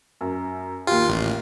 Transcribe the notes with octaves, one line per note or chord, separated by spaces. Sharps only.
F#2
D#2 F4 G4
A1